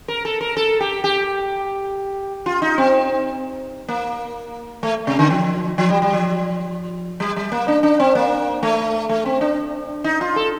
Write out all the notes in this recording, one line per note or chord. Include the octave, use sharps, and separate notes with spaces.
A#4
A4
A#4
A4
G4
G4
F4
D#4
C4
A#3
A3
C3
D3
F3
F3
G3
G3
F3
G3
G3
A#3
D4
D4
C4
A#3
A3
A3
C4
D4
D#4
F4
A4